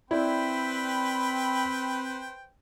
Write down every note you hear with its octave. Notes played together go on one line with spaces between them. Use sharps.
C4 E4 B4 C5 D5 G5 B5